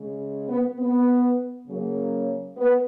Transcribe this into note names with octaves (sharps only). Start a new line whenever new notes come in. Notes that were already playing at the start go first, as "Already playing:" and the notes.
Already playing: C#3 G#3
B3
B3
C#3 F#3 A#3
B3